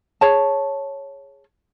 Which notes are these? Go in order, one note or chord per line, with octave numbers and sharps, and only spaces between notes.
G#4 C#5 A5